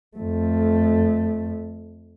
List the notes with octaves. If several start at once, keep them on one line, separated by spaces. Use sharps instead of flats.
F2 A3